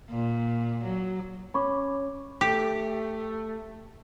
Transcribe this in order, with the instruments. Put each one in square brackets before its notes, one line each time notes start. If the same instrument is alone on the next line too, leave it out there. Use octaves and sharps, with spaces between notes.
[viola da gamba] A#2
F#3
[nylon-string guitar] C#4 [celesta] B5 C#6 D6
[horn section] A3 [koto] G4